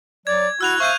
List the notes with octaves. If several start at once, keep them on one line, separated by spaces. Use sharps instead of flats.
F#3 D5 G#6
E4 F#4 E6 F#6 F7
C5 E5 F5 C#6 G6 D#7